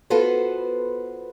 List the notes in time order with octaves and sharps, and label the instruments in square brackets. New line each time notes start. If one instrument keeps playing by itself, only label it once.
[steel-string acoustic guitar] B3 F4 F#4 A4 B4 C5